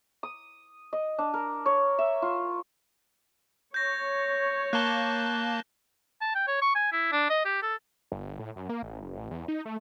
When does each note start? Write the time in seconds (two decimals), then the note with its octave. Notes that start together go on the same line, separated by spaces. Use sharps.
0.23 D#6
0.93 D#5
1.19 D4
1.34 A#4
1.66 C#5
1.99 E5
2.22 F4
3.74 C#5 G6 A#6
4.73 A#3 A5 F#6 G7
6.21 A5
6.35 G5
6.47 C#5
6.62 C#6
6.75 G#5
6.92 E4
7.12 D4
7.30 D#5
7.45 G4
7.62 A4
8.12 G1
8.39 A2
8.56 F#2
8.69 A#3
8.83 A1
9.01 F#1
9.17 A1
9.31 E2
9.48 D#4
9.65 A3